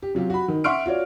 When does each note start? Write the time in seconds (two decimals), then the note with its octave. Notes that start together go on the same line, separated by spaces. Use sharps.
0.02 G4
0.15 C3 F#3 F4 G4
0.30 F#4 B5
0.48 D#3
0.64 E5 F#5 C6 C#6 F6 D7
0.86 F4 F#4 C#5 D5